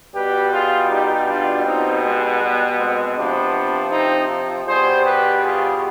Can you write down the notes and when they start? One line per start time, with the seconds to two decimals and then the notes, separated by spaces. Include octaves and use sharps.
0.14 B2 G3 G4 B4
0.52 F4 G#4
0.89 D#4 G4
1.27 D4 F4
1.65 B2 G3 C4 D#4
2.03 G#3
2.40 G3 B3
2.78 G#3 C4
3.15 C3 F3 B3 D4
3.91 C4 D#4
4.66 B2 G3 G#4 C5
5.04 G4 B4
5.42 F4 G#4